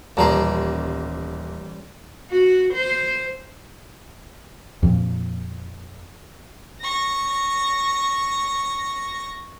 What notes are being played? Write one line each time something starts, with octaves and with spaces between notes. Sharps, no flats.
D#1 A1 G3 C5 A5 A#5
F#4
C5
F2 A#2 F3
C#6 A#6